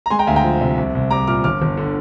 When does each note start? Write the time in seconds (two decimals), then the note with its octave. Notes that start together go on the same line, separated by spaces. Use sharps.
0.06 A#5
0.10 G#3 G#5 C6
0.19 G5 A#5
0.27 D2 F5 G#5
0.36 G5 A#5
0.44 F3
0.61 C3
0.78 C2
0.95 C2
1.10 G3 A#5 D6
1.27 A#2 D6 F6
1.44 G1 D6 F6
1.62 G1
1.77 D3